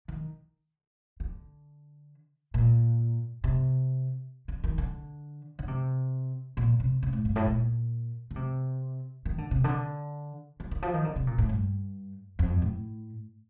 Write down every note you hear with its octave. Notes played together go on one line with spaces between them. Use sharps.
D#3
D3
A#2
C3
D3
D#3
D3
D3
C3
A#2
C3
C3
A2
G2
A2
A#2
D3
C3
D#3
D3
C3
D3
D#3
D#3
F3
D#3
D3
C3
A#2
A2
G2
F2
A2